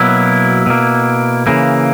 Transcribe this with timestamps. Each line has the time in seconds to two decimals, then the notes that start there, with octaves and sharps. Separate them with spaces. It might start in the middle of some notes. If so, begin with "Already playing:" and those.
Already playing: B2 F#3 A#3 E4
0.66 B2 A#3
1.47 C#3 E3 A#3